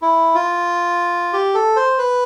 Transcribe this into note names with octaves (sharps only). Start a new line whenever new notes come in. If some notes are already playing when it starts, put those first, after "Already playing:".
E4
F4
G4
A4
C5
B4